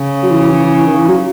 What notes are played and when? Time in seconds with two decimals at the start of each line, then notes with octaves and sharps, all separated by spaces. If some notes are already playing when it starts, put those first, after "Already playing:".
Already playing: C#3
0.23 F#3
0.30 E3
0.42 E3
0.53 E3
0.64 E3
0.75 E3
0.87 D#3
0.97 E3
1.08 F#3